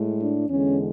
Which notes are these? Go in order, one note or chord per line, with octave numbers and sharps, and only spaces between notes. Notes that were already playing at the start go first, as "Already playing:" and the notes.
Already playing: A2 G#3
D4
E2 D3 G#3 C#4